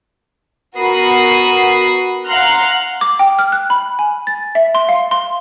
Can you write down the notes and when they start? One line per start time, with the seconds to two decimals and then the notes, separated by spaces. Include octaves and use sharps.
0.76 B3 F#4 A#4 B5 D#6 C7
2.29 F5 F#5 A#5 C6 F6 F#6
3.01 D6
3.19 G5
3.39 F6
3.52 F#6
3.70 B5
3.99 G#5
4.27 A6
4.55 E5
4.75 C6
4.89 F5
5.11 C6